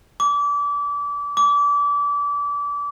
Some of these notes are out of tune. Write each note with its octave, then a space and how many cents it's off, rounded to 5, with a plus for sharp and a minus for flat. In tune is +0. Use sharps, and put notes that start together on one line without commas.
D6 -30
D6 -30